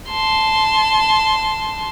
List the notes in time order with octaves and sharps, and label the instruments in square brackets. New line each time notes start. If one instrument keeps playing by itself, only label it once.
[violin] A5 C6